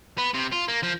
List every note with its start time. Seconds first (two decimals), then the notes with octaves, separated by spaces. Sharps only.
0.18 B3
0.34 C3
0.52 F4
0.68 A#3
0.83 F3